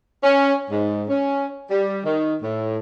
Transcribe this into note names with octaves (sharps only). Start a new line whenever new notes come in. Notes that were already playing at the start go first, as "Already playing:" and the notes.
C#4
G#2
C#4
G3
D#3
A2